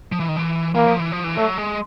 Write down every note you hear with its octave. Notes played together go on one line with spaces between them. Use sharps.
F3
E3
D#3
E3
E3 A#3
F3
E3
F3
E3
F#3 A3
G#3